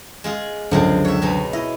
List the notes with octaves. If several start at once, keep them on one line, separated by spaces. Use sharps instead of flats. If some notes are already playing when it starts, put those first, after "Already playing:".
G#3 F4 G#4
C#2 F#2 D3 F3 G#3 C4
C#5 E5
B2 G#3 D#4
E4 D#5